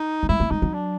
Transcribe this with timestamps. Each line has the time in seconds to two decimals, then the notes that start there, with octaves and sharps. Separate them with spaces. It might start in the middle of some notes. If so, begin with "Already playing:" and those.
Already playing: D#4
0.23 A3
0.29 G#3 E4
0.40 A3
0.51 G#3 D#4
0.62 F#3
0.74 D4